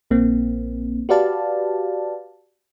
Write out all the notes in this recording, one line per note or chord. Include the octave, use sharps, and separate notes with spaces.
A#1 A#3 C4
F#4 G4 B4 D5 F5 A5